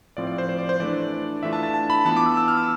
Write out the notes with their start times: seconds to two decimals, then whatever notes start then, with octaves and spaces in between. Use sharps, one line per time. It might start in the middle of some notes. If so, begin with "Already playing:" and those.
0.17 A2 F3 C4 F4 D5
0.27 D5
0.38 C5
0.49 C5
0.58 D5
0.69 C5
0.80 E3 A3 D4 D5
1.43 E3 A3 D4 F4 E5
1.53 A5
1.63 A5
1.74 A5
1.90 B5
2.05 E3 B3 F4 A5
2.17 D6
2.26 E6
2.37 E6
2.48 F6
2.57 E6